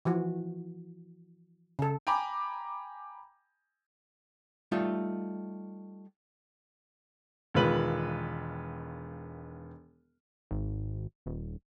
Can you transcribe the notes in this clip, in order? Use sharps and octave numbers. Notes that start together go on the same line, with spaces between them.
E3 F3 F#4
C#3 A4
G5 G#5 A#5 B5 D6
G3 A3 D#4 F4 E5
E1 D#3 G#3 F4 B4 F#7
G#1
D#1